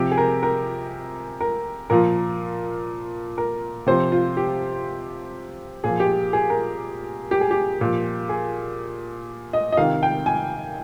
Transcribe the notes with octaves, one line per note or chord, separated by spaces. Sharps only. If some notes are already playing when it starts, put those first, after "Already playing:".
Already playing: C3 F3 G4
G#4
A#4
A#4
A#4
A#2 F3 A#4
A#4
C3 F3 C5
F4
G4
A#2 F3 G#4
G4
G#4
A#4
G4
G#4
G4
A#2 F3
G#4
D#5
D#5
C3 D#3 F5
G5
G#5